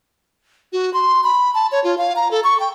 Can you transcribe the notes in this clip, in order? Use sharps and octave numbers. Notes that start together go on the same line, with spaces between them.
F#4
C6
B5
A5
C#5
F4
F5
A#5
A4
C#6
G5